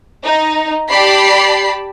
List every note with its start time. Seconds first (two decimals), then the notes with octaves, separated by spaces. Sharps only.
0.24 D#4
0.89 G4 D5 A5 B5 C7